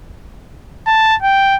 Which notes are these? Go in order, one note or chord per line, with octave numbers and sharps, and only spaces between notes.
A5
G5